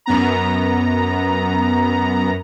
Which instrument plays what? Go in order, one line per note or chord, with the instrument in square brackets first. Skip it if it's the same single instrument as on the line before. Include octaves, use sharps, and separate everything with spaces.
[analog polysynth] F#2 B3 A#5